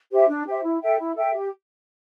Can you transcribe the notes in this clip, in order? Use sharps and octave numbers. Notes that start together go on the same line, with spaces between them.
G4 C5 E5
D4
G4 C5 E5
E4
A4 E5 G5
E4
A4 E5 G5
G4